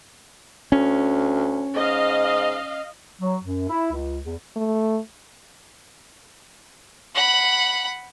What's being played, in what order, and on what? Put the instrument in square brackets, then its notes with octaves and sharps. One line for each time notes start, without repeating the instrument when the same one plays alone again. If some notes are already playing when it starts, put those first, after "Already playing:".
[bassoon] D2 [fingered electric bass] C#4
[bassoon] G#2 [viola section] D#5 F5
[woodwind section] F#3
F#2
E4
C#2
E2
[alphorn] A3
[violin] F#5 B5